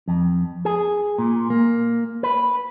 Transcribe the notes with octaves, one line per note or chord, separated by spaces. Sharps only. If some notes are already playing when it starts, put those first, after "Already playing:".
F2
G#4
A#2
A#3
B4